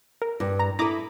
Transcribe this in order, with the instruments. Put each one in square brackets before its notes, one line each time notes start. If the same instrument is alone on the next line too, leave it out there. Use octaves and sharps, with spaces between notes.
[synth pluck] A#4
[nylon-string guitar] G2
[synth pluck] A#5
[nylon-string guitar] E4 A4 [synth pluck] A#5 D6 D#6